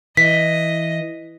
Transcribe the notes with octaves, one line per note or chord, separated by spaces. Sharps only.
E3 D#5 B6